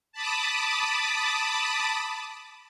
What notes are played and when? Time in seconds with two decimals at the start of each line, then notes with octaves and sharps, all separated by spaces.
0.12 A5 B5 D6 D#6